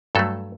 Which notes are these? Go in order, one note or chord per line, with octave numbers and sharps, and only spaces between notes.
G2 F#3 A3 A4